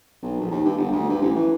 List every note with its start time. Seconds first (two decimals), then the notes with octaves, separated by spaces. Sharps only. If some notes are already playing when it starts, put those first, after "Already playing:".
0.22 B1
0.40 A#1
0.51 D#2
0.65 G2
0.78 G1
0.92 D2
1.09 G2
1.22 A1
1.35 E3